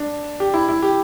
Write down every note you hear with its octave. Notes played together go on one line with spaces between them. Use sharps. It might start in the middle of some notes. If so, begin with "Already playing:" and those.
Already playing: D4
G4
E4
E4
G4